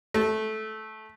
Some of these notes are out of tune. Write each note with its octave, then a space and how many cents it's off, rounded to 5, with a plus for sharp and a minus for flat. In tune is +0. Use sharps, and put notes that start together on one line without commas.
A3 -15